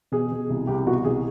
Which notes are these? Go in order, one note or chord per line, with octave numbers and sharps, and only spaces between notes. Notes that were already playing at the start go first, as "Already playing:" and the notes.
B2 G#4
B2
C2
C2 G4
B2 F#4
C2 G#4